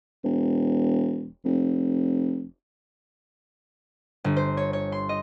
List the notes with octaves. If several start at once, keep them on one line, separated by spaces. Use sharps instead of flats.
E1
F1
G1
C5
C#5
C#5
C6
D#5